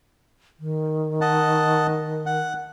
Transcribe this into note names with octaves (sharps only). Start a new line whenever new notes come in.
D#3
D#5 F#5 A5
F#5